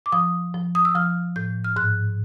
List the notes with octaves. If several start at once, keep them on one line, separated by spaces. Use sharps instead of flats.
D6
F3 D#6
F3
D#6
E6
F3 F6
A2 G6
F6
G#2 F#6